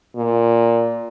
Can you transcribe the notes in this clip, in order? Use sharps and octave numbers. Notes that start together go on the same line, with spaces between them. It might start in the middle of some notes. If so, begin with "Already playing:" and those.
A#2